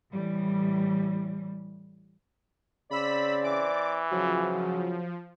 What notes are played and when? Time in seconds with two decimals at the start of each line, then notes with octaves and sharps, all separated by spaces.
0.12 A2 E3 G3
2.91 C#3 C4 C5 D5 B5 E6 B6
3.44 E3 D6
4.11 G#2 C#3 F3 F#3